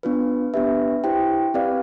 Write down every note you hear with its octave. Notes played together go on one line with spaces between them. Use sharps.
B3 D4 F4 B4
B3 D4 G4 B4 E5
E4 G4 C5 G5
C4 G4 B4 D5 F5